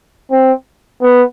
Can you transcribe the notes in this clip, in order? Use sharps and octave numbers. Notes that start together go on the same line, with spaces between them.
C4
B3